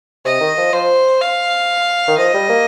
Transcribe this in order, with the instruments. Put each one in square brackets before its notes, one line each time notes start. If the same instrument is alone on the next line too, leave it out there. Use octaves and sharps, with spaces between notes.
[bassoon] C3 [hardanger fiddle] D#5
[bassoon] D#3
F3
[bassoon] F3 [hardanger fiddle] C5
[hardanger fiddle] F5
[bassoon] D#3
[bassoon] F3 [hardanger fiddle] D#5
[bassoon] G3
A#3